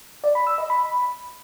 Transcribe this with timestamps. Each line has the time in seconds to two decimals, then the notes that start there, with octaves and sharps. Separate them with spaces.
0.24 D5
0.35 B5
0.47 E6
0.58 D#5
0.70 B5